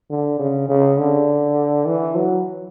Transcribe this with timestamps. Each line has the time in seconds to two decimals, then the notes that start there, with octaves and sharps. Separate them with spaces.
0.10 D3
0.39 C#3
0.69 C#3
0.98 D3
1.86 E3
2.15 F#3